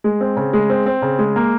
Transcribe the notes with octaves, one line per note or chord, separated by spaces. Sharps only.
G#3
C4
C#3
G#3
C4
C4
C#3
G#3
A#3